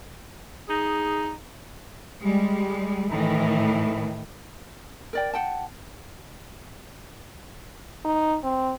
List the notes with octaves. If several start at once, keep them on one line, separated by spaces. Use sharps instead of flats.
D#4 G#4
G3 G#3
A2 D#3 E3
A#4 D5 G5
F#5 G5 A5
D#4
C4